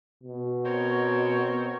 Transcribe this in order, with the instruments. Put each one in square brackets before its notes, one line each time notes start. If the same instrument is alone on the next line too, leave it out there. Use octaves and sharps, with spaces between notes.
[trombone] B2
[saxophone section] C4 A#4 C#5
[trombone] B3